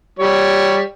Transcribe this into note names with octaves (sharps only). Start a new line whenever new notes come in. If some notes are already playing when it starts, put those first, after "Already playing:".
G3 C#5